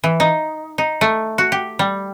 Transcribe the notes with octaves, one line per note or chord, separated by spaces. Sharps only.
E3
D#4
D#4
A3
F#4
G4
G3